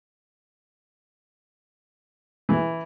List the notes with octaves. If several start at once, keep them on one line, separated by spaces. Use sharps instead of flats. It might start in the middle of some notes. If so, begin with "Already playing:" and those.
E3